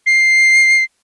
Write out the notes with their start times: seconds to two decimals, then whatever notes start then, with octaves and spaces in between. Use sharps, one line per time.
0.06 C7